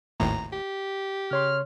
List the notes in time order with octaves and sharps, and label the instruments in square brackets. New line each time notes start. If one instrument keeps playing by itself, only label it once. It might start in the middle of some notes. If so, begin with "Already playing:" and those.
[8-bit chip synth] G#1 D#2 A2 [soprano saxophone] A#5
[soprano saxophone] G4
[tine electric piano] C#3 C#5 C6 [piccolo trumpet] F6